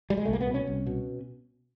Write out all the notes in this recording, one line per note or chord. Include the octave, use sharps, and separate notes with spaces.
G3
G#3
C2 A3
A#3
B3
B2
C#4
C2
B2